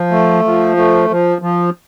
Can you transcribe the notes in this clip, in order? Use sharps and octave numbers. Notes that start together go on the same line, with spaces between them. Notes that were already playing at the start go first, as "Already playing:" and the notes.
Already playing: F3
A3
F3
A3
F3
F3